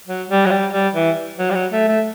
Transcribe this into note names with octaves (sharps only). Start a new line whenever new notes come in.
F#3
G3
F#3
G3
G3
E3
F#3
G3
F#3
A3
A3